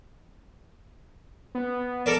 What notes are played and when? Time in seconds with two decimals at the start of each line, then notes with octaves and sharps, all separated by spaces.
1.55 B3
2.06 A4 A#4 D5